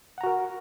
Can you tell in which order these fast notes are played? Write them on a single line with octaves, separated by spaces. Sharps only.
F#5 A#5 F#4 A#4